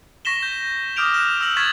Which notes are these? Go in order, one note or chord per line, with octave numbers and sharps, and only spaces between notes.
C#6 A#6 B6 E7 G7
G6
D6 D#6 F6 G6 D7 F7
F6 F#6 E7 G7
E6 F6 A#6 F#7
C#6 G#6 A6 B6 E7 F#7